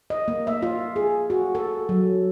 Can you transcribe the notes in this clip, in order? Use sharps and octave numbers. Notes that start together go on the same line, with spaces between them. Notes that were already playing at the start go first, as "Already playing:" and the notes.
D#5
A#3
E5
F4
G#4
F#4
A4
F#3